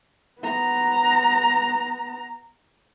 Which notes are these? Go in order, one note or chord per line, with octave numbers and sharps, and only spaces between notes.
B3 A#5